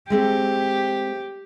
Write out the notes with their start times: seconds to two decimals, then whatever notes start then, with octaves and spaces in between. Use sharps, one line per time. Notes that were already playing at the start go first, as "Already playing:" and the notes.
0.10 G#3 A3 C4 G4